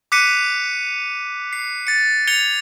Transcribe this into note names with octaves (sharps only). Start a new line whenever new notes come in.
D6 F#6 B6 C#7 D#7
C7
A6 C#7
G#6 C#7 F7 G7